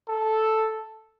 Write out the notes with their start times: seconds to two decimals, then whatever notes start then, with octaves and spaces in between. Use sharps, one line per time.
0.08 A4